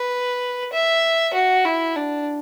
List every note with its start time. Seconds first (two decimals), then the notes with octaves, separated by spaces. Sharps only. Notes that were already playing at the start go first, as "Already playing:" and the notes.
Already playing: B4
0.73 E5
1.34 F#4
1.65 E4
1.96 D4